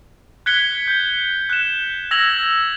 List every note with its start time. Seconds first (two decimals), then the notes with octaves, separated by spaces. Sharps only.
0.46 F#6 G#6 B6 C#7 G7
0.88 G6
1.50 F#6 E7
2.11 E6 G#6 A#6 F7 F#7